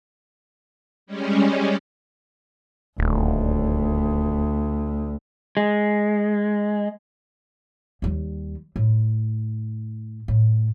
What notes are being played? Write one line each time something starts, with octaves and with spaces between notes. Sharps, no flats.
G3 G#3 C#4
D#1 D2
G#3
D#2 G3
A2
A2